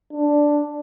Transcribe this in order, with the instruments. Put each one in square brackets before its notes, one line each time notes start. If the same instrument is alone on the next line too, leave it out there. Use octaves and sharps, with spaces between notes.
[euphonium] D4